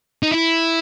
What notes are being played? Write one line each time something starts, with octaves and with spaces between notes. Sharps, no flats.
D#4
E4